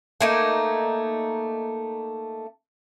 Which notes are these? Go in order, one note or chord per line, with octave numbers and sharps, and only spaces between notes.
A3 A#3 D#4